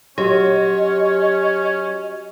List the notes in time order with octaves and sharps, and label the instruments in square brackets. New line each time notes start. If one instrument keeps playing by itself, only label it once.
[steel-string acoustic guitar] F#3 [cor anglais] C#4 [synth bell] G4 [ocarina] D#5